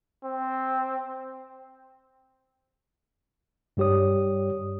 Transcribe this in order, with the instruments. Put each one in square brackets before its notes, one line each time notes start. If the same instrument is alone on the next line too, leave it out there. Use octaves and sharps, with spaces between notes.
[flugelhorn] C4
[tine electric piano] G2 G3 G4 C#5 D#6